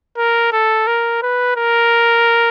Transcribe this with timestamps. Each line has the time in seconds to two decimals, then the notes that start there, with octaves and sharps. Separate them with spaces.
0.17 A#4
0.52 A4
0.87 A#4
1.22 B4
1.57 A#4